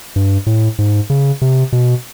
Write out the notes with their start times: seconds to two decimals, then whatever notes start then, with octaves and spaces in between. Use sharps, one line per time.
0.16 G2
0.46 A2
0.79 G#2
1.10 C#3
1.41 C3
1.72 B2